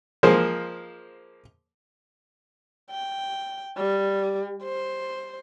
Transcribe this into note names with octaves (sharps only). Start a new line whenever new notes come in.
F3 G#3 A#3 C5
G5
G3
C5